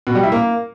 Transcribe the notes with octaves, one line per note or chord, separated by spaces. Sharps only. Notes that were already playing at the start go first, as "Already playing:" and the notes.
B2
G3
E4
A#3